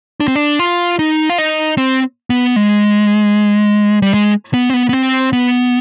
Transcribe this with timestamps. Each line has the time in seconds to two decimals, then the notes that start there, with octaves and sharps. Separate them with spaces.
0.20 D4
0.28 C4
0.35 D4
0.59 F4
0.99 D#4
1.30 F4
1.38 D#4
1.78 C4
2.30 B3
2.56 G#3
4.02 G3
4.14 G#3
4.54 B3
4.70 C4
4.74 B3
4.89 B3
4.93 C4
5.33 B3